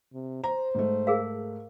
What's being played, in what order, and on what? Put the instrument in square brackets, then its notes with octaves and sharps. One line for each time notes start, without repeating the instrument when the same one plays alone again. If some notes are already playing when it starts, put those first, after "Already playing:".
[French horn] C3
[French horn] C5 [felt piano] A#5
[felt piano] G#2 A3
[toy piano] G#4 A#4 F5